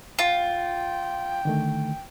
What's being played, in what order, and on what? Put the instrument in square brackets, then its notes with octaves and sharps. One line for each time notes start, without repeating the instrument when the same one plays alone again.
[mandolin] F4 [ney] G5
[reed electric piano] D3 D#3 A3